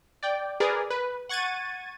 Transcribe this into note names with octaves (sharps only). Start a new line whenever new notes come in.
D5 G5
G#4 A#4 B4 D5
B4
F#5 C#6 G#6 A6 D#7